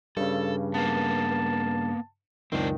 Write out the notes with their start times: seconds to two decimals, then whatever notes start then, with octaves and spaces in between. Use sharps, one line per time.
0.17 G2 C#3 A4
0.74 A#3 B3 A5
2.52 C#2 F#2 D#3 C4 D4